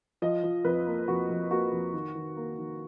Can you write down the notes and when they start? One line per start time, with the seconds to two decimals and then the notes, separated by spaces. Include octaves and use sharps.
0.22 F3 D#5
0.43 F3
0.65 F2 B4
0.87 A#3
1.08 F2 F#4
1.30 F2
1.51 A#3 F#4
1.72 F2
1.94 D#3
2.15 D#3
2.36 A#3
2.58 D#3